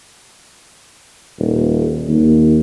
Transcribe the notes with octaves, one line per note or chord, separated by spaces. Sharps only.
D#1
D#2